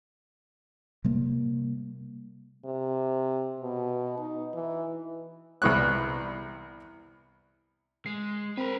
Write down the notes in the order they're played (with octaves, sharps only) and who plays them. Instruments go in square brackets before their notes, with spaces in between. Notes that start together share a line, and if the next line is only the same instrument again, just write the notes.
[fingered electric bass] C3 G3 A#3
[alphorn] C3
B2
D#4
E3
[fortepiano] C2 E3 B3 C#6 F#6
[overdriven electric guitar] G#3 [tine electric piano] C7
[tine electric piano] C4 [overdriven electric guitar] A#4 B4